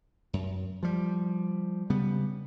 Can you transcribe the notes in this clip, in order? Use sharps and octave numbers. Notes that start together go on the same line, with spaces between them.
F#2
F3 G3
C#3 G3 B3